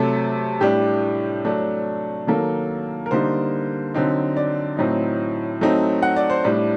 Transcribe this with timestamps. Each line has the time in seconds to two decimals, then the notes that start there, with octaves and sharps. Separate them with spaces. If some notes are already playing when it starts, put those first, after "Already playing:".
Already playing: C3 F#3 A3 A4
0.61 A2 G3 D4 G4
1.45 F#3 A3 D4
2.27 D#3 F#3 A#3 A4
3.06 A#4
3.11 D3 G3 A#3 D#4 C5
3.94 D3 F#3 C4 D#4
4.37 D5
4.77 A2 F#3 C4 D#4
5.61 F#3 A3 C4 D#4
6.03 F#5
6.16 D5
6.30 C5
6.44 A2 G3 D4